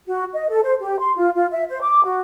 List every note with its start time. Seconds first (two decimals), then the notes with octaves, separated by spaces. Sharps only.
0.07 F#4
0.34 D#5
0.49 A4
0.64 C5
0.80 G4
1.00 C6
1.16 F4
1.35 F4
1.51 E5
1.69 C5
1.82 D6
2.05 F#4